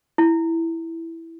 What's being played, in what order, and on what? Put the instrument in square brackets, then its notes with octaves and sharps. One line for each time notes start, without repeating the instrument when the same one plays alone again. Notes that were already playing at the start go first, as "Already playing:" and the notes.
[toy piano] E4